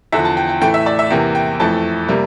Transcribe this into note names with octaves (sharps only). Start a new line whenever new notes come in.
E2 D3 F3 E5
A5
G5
G5
A2 E3 A3 G5
E5
D5
E5
E2 C3 E3 A#3 G5
G5
F2 E3 A3 A5
C3 G3 A#3